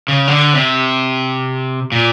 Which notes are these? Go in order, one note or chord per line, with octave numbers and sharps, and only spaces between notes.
C#3
D3
C3
A#2